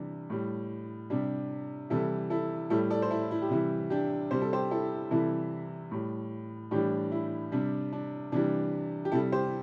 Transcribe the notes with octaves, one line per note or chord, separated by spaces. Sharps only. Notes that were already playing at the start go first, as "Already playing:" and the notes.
Already playing: C3 E3 G3 D4
A2 G3
C3 G3 D4
C3 E3 G3 E4 A4
E4 A4
A2 G3 E4 A4
A4 D5
C5
E4 A4
E4
G4
C3 E3 G3 E4
D4 G4
C3 G3 C5
A4
G4 C5
E4 A4
C3 E3 G3 E4 A4
A2 G3
A2 E3 G3 D4 G4
E4
C3 G3 D4
D4
C3 E3 G3 D4
G4
C3 G3 E4 A4
G4 C5